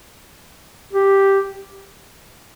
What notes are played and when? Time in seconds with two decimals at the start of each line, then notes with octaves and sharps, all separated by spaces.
0.93 G4